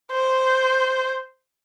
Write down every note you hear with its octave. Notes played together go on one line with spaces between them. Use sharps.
C5